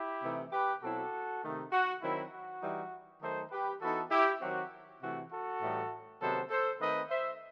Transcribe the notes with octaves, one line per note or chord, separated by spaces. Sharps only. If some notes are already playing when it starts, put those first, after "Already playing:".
Already playing: E4 G4
C3 E3 A3 D#4
G4 B4
B2 F#3 C4 E4 F#4 A4
C3 D#3 A3 D#4
F#4
D#3 F#3 C4 E4
F#4
E3 G3 D#4
D#3 F#3 A3 D#4 A4 C5
G4 B4
E3 B3 D#4 F#4 A4
E4 G4
D#3 F#3 C4 F#4
C3 E3 A3 F#4
F#4 A4
A2 E3 G3 D#4
C3 D#3 F#3 B3 A4 C5
A4 C5
D#3 A3 C4 D#4 B4 D#5
C5 E5